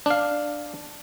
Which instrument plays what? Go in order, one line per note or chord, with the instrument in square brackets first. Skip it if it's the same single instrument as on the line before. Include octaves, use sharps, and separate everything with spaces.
[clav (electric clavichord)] D4 F5